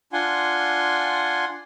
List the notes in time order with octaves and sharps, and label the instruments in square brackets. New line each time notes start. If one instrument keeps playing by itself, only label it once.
[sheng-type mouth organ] D4 F4 F#5 G#5 C6